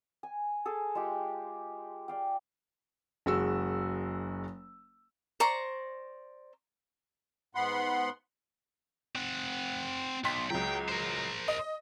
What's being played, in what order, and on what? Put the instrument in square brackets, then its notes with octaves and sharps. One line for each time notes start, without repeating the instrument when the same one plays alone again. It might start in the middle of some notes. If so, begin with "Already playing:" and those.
[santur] G#5
G#4 A4
G#3 F4 G4
D5 F5 G5
[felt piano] F#1 G#3 F#4 E6
[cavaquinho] C5 D5 A#5 C#6
[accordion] G#2 B3 F#5 B5 C6
[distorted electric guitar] C4 F#5
[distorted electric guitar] B1 [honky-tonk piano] G5 C6 B6
[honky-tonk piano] C#2 F#3 [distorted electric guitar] G5
[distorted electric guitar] A#4 C5
[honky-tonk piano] D#5